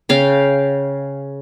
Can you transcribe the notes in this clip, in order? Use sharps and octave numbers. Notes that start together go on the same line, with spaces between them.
C#3 F5 G5